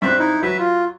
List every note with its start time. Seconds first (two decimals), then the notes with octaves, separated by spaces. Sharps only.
0.02 G2 C4 E5 F#6
0.19 D#4 E4
0.43 F#3 B4 E5
0.59 F4